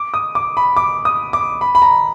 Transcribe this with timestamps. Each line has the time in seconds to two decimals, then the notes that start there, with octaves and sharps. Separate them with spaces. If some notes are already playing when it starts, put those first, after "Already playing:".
Already playing: D6
0.14 D#6
0.35 D6
0.57 B5
0.77 D6
1.05 D#6
1.33 D6
1.61 B5
1.75 B5
1.82 A#5